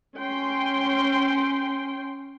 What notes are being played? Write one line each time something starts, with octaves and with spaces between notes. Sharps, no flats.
C#4 G5 C6